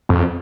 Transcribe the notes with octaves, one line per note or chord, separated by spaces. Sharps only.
F2